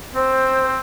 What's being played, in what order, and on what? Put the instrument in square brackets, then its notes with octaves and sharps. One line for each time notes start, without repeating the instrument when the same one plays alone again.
[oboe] C4 [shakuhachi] C5